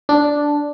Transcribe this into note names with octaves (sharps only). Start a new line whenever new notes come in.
D4